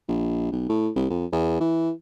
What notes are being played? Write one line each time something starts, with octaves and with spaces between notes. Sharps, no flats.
A#1
B1
A2
C2
F2
E2
E3